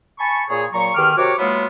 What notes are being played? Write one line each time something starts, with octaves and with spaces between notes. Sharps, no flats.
G#5 A5 B5 C#6
A#2 G#4 C#5
A#2 F#3 A#5 C#6
E2 D#3 G4 D6 F6
C3 F#4 A#4 C#5 D6
F#3 G#3 A#3 B3 E4 F4